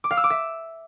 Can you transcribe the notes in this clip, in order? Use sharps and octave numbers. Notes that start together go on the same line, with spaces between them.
D6
F5
E6
D6
E5